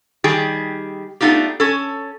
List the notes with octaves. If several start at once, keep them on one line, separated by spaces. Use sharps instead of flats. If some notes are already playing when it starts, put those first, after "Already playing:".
D#3 G3 G4 G#4
A3 B3 D4 D#4 F4 G4
C#4 A4